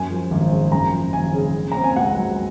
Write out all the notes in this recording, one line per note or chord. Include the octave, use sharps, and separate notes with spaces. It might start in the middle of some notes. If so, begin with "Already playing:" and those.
Already playing: F#2 G#5
F3
G#1
C#3
F#2 A#5
F3
G#1 G#5
C#3
C#3
C4 A#5
G#5
C#2 F#5
F#3